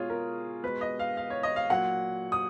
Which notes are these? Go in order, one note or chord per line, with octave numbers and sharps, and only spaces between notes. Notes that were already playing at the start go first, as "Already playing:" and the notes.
Already playing: B2 G#3 F4 G#4 C#5
A#4
B2 G#3 B4
D#5
F5
F5
C#5
D#5
F5
A#2 F#3 F#5
D#6